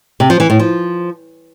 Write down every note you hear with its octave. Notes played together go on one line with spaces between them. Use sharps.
C3
F3
E3
A2
F3